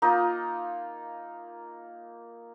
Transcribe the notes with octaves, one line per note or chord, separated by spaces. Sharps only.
A#3 D#4 F4